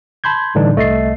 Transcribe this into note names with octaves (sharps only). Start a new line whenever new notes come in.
A5 B5 C6 G6 G#6
A2 D3 E3 G3 D4 D#4
C2 A3 D#5 A6 C7